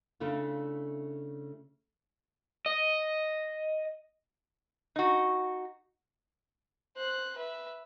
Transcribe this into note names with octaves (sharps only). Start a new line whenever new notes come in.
C#3 A3 D4 E4 F4
D#5
D#4 F#4
C5 F#6
B4 E5